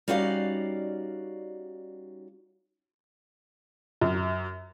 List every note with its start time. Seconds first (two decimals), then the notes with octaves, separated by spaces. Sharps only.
0.08 G3 C#4 D#4 F#4 D5 F5
4.01 F#2